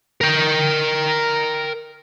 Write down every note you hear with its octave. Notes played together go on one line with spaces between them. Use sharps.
A#4 G5